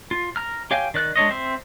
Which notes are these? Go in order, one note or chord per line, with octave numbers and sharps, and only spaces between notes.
F4
A#5 F6
G4 C#5 F5 G5 G#5
D#3 D5 F#6
G#3 D4 C#5 D#5
C4 C5 E5